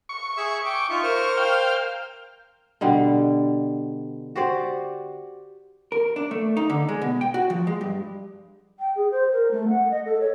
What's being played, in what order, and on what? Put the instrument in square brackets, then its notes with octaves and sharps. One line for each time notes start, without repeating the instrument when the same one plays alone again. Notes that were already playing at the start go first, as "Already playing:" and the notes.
[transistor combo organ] C#6
[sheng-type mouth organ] G#4 E5 E6
G5 D6
[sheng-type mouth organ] D#4 F4 E5 [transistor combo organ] C#6
[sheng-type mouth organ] A#4 C5 F6
[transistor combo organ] F5 G5
[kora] B2 D3 G3
F#4 G4 C5 D5
[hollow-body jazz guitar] A#4
D4
A3
D#4
D3
G#3
B2
G5
F#4
F3
G#3
G2
[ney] G5
G#4
C5
A#4
A3
F#5
D#5
A4
C#5